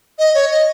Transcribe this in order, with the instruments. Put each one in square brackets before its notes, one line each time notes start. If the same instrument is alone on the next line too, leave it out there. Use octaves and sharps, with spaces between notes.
[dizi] D#5
C#5
D#5